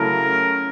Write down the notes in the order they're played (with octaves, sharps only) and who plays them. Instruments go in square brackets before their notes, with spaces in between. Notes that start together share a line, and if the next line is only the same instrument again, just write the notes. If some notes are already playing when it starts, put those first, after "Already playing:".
Already playing: [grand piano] C#3 F#3 A3 C#4 E4 [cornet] A#4